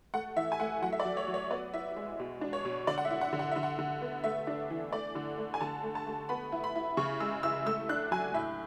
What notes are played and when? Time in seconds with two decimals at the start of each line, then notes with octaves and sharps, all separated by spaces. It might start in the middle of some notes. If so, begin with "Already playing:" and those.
0.14 A3 F#5
0.36 E3 E5
0.52 G#5
0.60 A3 F#5
0.82 F#3 F#5
0.92 E5
1.00 D5
1.05 F#3
1.17 C#5
1.28 F#3
1.34 C#5
1.50 B3 D5
1.74 E4 E5
1.97 G#3
2.19 B2
2.41 D4
2.53 C#5
2.65 B2
2.87 D3 D5
2.98 F#5
3.05 E5
3.11 E4
3.21 F#5
3.33 D3
3.39 F#5
3.51 D3 E5
3.63 F#5
3.79 D3
4.02 B3
4.24 A3 E5
4.47 D4
4.70 E3
4.93 A3 D5
5.15 D3
5.38 A3
5.54 G#5
5.61 D3 A5
5.83 A3
5.95 A5
6.07 A3
6.29 B3 B5
6.52 E4
6.64 B5
6.75 E4
6.97 C#3 C#6
7.20 G#3 E6
7.43 E4 E6
7.66 A3 E6
7.89 D4 F#6
8.11 F#3 G#5
8.34 A2 E5